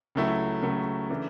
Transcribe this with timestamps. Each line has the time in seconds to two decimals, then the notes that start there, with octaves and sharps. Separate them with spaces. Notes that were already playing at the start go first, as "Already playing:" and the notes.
0.15 C#2 C#3 F#3 A3 E4
0.62 C#2 C#3 F#3 A3 E4
1.09 C#3 E3 A3 D4